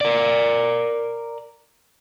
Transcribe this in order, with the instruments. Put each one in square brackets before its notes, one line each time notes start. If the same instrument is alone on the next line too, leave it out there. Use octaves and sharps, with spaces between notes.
[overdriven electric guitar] A#4 D5